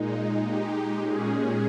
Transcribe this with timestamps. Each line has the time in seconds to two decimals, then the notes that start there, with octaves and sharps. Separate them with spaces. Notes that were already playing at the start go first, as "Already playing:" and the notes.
Already playing: A#2 G#3 D#4
0.41 G#3 D#4 G4
0.99 A#2 G#3 C#4 G#4